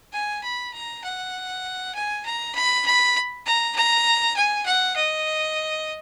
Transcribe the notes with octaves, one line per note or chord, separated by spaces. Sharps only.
G#5
B5
A#5
F#5
G#5
A#5
B5
B5
A#5
A#5
G#5
F#5
D#5